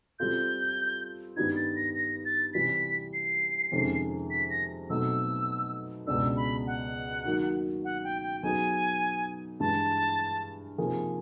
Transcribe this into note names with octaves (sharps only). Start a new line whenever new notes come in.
G3 C4 F4 A4 G6
G2 D#3 G3 B3 D#4 G#6
A6
A#6
A#6
A6
C3 E3 G3 B6
C7
F2 C3 D#3 G#3 C#4
B6
A#6
B2 F#3 A3 C4 D#4 E6
C#2 B2 G#3 B3 D4 E6
B5
F#5
D#3 F#3 A#3 D#4 F#4
F#5
G5
G5
F#3 B3 D#4 G#4 G#5
G2 E3 G#3 A5
C3 F3 A#3 D#4 G#4